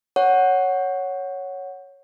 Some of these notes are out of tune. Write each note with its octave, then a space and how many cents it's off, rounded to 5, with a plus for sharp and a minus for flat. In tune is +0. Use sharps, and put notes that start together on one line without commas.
C#5 +0 F#5 +0